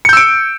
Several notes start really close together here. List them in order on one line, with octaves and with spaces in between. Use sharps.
C#7 G6 E6 D7